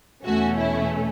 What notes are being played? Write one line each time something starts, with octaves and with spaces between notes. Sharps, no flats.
E2 B2 A3 C#4 F#4
E4